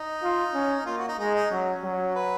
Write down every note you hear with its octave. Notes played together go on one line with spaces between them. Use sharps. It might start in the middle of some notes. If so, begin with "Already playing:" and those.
Already playing: D#4
F4
C#4
A#3 F4
F#4
D#4
G#3 D#4
D#4
F#3 C#4
F#3
B4